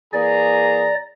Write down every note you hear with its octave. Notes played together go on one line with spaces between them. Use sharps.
E3 A#3 G#4 D5 A#5